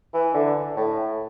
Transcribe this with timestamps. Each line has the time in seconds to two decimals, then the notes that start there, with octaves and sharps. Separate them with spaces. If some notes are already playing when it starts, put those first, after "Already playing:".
0.14 E3
0.34 D3
0.76 A2